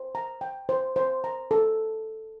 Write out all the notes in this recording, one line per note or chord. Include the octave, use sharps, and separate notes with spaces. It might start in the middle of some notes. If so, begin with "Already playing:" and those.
Already playing: C5
A#5
G5
C5
C5
A#5
A4